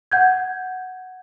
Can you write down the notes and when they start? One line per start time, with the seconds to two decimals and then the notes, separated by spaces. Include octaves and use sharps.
0.12 F#5 G6 G#6